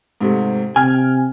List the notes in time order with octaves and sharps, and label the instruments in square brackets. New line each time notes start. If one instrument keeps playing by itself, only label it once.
[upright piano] G#2 C3 A3
[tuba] C3 [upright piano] G5 F6 G#6 [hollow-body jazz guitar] G#5